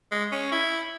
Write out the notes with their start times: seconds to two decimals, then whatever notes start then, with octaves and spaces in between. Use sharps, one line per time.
0.12 G#3
0.32 C#4
0.52 E4